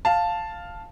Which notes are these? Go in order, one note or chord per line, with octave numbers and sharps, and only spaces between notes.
F5 A5